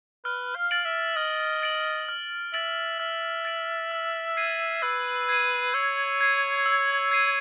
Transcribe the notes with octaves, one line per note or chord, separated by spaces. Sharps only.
B4 F6
F5
A6 D7 F#7
E5
D#5 F6
A6 D7 F#7
F6
E5 A6 D7 F#7
E5 F6
A6 D7 F#7
E6
G#6 C7 D#7
B4 E6
G#6 C7 D#7
C#5 E6
G#6 C7 D#7
E6
G#6 C7 D#7